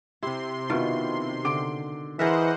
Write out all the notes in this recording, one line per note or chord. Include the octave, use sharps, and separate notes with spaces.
C3 E4 G4 C6
B2 D#3 B3 E4 F4
D3 D6 D7
E3 G#4 A#4 C5 D#5 E5 F#5